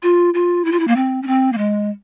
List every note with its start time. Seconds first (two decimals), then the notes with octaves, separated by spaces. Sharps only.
0.03 F4
0.34 F4
0.65 E4
0.72 F4
0.80 E4
0.88 A#3
0.96 C4
1.22 C#4
1.27 C4
1.52 A#3
1.58 G#3